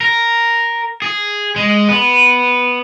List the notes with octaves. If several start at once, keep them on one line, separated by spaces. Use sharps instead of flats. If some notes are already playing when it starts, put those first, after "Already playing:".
A#4
G#4
G#3
B3